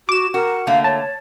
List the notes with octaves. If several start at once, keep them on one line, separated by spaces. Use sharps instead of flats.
F#4 D6 E7
F#4 A#4
D3 A3 A#3 F5
C#5 A5